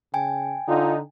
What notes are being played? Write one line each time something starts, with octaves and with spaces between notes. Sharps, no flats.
C#3 G5 G#5
D3 D#4 F4